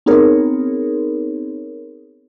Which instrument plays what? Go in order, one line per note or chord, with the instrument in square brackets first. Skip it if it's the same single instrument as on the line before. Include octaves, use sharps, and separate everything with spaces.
[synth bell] B3 C4 D#4 G#4 A#4 C#5